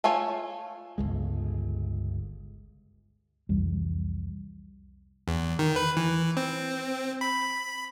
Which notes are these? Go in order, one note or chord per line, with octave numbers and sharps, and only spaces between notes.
A3 F4 C#5 G#5
G1 C#2 G#3
C2 F2 E3 G3
E2
D#3
B4
E3
C4
B5